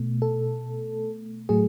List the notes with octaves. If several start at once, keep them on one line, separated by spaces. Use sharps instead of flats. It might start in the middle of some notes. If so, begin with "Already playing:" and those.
Already playing: B2 A3
A4
A2 F#3 A3 G#4